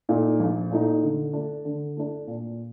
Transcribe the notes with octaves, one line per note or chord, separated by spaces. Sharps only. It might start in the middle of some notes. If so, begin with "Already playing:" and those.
A#2 A3 D#4
A#1
A#2 A3 D#4
D3
A3 D4
D3
A3 D4
A#2